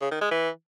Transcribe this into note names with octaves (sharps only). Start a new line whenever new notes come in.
C#3
D#3
G#3
E3